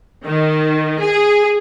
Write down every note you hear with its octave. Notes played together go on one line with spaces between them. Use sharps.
D#3
G#4